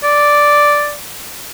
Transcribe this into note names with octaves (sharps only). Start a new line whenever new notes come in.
D5